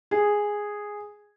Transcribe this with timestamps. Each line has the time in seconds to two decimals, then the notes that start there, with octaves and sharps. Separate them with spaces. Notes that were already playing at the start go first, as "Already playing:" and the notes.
0.11 G#4